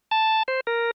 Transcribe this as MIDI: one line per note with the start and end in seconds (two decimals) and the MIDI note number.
0.11 0.43 81
0.48 0.60 72
0.67 0.91 70